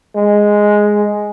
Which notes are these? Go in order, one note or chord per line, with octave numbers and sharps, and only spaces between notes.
G#3